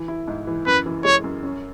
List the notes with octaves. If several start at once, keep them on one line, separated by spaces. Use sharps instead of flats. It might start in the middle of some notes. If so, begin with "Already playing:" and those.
Already playing: E3
E4
G#2
E3
F#2 B4
E3
G#3 C#5
F#2
C#4